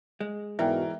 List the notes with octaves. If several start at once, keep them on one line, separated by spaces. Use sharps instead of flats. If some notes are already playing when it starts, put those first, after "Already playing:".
G#3
G#2 B2 E3 A#4 D5 E5 G5